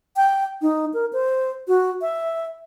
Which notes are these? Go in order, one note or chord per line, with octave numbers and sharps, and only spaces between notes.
G5
D#4
A#4
C5
F#4
E5